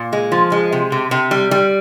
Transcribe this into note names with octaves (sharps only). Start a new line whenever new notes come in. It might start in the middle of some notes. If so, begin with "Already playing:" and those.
Already playing: A#2
G#3
F3
G#3
C3
C3
C3
G3
G3